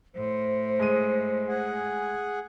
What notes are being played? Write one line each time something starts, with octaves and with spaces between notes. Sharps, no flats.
A2 C5
G#3 D#6 D#7
G#4 F#5 G#5